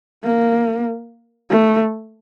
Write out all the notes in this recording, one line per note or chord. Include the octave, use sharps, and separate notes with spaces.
A#3
A3